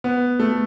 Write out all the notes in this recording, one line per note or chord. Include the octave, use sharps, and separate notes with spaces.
B3
A3